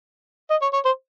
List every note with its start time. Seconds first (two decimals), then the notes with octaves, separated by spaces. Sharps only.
0.50 D#5
0.62 C#5
0.73 C#5
0.85 C5